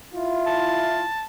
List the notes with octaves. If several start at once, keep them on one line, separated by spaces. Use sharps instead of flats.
E4 F4
A5